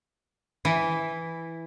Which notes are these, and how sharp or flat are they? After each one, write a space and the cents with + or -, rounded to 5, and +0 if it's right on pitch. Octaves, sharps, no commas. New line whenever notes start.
E3 +0 E4 -5